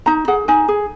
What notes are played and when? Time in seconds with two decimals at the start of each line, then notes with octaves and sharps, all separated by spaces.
0.06 D#4 A#5
0.28 G#4 F#5
0.48 D#4 G#5
0.68 G#4